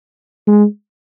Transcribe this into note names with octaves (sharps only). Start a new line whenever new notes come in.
G#3